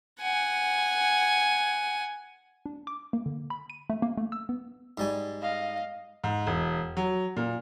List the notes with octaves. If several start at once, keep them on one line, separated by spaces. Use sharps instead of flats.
F#5 G#5
D4
D6
A#3
D3
B5
D#7
A3
A#3
A3
E6
B3
G#2 G3 G#5
D#5 F5
G#2
E1
F#3
A#2